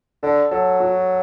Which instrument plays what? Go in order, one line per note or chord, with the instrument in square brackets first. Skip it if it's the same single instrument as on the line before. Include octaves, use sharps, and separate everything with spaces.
[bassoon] D3 [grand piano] A4
[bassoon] F#3 [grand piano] A4
[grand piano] F#4